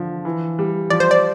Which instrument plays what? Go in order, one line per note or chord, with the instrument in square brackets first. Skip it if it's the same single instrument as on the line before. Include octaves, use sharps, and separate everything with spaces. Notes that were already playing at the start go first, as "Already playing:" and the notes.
Already playing: [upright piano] D3 F3
E3
G3
[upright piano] F3 [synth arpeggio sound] D5
[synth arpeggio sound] C5
D5